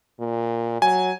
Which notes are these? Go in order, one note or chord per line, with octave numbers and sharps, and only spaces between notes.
A#2
F#3 G#5